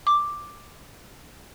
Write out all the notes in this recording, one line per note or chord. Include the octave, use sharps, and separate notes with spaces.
D6